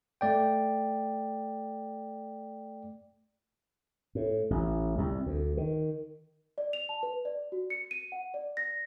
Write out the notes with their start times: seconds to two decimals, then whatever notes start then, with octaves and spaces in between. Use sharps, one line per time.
0.21 A3 D5 G5
4.15 A2
4.50 A1
4.98 C2
5.26 D2
5.57 D#3
6.58 D5
6.73 F7
6.89 A5
7.03 B4
7.25 D5
7.52 F#4
7.70 C#7
7.91 D#7
8.12 F#5
8.34 D5
8.57 A#6